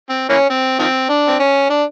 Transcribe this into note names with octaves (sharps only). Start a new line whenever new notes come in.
C4
E3 A#3 C#4
C4
D#3 F3 C4
D4
C4
C#4
D4